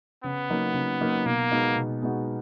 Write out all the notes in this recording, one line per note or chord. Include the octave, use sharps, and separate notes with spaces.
C#3 B3
F#3 A#3 D#4
C#3
F#3 A#3 D#4
B2 A#3
G#3 B3 D#4 F#4
B2
G#3 B3 D#4 F#4